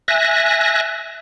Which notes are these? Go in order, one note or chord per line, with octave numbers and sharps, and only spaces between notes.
E5 G#5 F#6 A#6